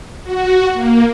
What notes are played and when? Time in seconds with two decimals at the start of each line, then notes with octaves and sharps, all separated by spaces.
0.23 F#4
0.73 A#3